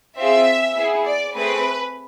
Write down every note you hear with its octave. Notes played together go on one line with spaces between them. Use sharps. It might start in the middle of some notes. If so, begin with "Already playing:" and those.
C4 F4 G#4 E5
B3 E4 G#4
D5
A3 C4 G#4 B4